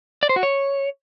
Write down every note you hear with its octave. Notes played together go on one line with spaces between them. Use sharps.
D5
C5
F#4
C#5